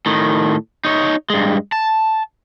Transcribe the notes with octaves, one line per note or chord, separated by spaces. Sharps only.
A2 D#3
D#4 C#5
G2 G#3
A5